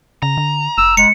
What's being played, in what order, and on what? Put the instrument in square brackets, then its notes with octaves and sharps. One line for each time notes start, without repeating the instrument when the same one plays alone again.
[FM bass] C#3 [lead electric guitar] A#5
[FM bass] D3
[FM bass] F1 [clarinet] E6
[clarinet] G#3 [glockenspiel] C#7